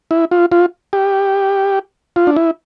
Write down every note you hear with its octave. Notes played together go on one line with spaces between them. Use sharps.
E4
F4
F4
G4
F4
D4
E4